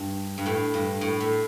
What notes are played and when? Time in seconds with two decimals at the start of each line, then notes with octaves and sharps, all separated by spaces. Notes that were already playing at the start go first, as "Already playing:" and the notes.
Already playing: G2
0.38 G2
0.46 A2
0.74 G2
1.01 A2
1.20 A2